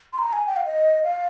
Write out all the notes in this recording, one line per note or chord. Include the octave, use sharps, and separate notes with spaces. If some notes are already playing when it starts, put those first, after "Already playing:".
C6
A#5
G#5
G5
F5
D#5
F5